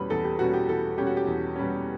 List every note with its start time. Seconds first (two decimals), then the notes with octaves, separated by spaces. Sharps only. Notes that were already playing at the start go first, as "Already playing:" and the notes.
Already playing: E2 B2 G3 C#4 B4
0.10 E2 A4
0.24 G4
0.39 B2 G3 C#4 F#4
0.53 G4
0.68 E2 A4
0.98 B2 G3 C#4 G4
1.07 F#4
1.17 G4
1.27 E2
1.56 B2 G3 C#4